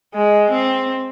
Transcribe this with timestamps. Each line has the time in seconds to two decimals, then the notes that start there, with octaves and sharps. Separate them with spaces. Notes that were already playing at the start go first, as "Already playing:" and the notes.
0.14 G#3
0.50 C4